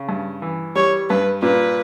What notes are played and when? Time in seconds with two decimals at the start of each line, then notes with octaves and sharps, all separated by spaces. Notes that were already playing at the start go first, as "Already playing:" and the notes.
Already playing: C#3
0.09 G2
0.42 E3
0.76 G3 C#5
1.10 G2 B4
1.42 A#2 B4